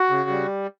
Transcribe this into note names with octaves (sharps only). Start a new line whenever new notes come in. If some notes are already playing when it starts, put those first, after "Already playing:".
Already playing: F#4
C#3
G3